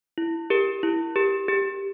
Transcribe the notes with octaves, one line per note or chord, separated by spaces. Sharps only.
E4
G4 A#4
E4
G4 A#4
G4